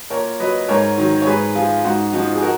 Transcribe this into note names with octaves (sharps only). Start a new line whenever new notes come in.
A#2 A#4 C#5
F#3 B4 D#5
G#2 A#4 C#5
D#3 F#3
C#5
G#2 G#4 B4
F3 F4 G#4
G#2 D#4 F#4
F3 D#4 F#4
G#4
F#4 A#4